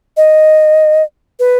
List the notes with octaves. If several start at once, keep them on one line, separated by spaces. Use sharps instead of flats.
D#5
B4